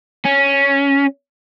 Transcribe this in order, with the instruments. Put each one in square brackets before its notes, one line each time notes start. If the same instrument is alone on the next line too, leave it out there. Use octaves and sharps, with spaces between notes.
[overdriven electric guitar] C#4